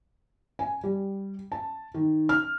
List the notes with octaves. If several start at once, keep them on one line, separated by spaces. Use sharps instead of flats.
G#5
G3
A5
D#3
F6